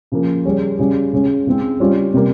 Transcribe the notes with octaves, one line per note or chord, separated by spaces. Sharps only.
C#3 F3 A#3
G3 C#4 G#4
C#3 G3 C#4 G#4
C#3 G#3 C#4
C#3 G#3 C4
G3 C#4 F4 C5
C3 G3 A#3